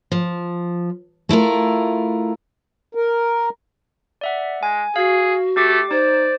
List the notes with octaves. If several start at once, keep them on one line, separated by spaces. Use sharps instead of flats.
F3
A3 E4 F4 A#4
A#4
D5 E5 F#5
G#3 G#5
F#4 G#4 F5
A3 G4 D6
D#4 C5 D5